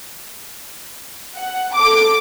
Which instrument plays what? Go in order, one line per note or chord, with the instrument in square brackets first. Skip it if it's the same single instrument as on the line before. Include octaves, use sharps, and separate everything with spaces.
[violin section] F#5
A4 D6